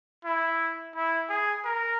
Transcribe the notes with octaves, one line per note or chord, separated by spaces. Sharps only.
E4
E4
G#4
A#4